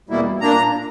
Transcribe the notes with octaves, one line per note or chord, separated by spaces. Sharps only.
E2 B2 G3 A#3 E4
A#2 A#3 D4 A#5